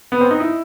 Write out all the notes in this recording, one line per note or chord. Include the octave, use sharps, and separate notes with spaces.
B3
C4
D#4
E4